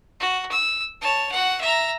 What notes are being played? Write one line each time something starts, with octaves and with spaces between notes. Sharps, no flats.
F#4
E6
C#5 A5
F#4 F#5
E5 A#5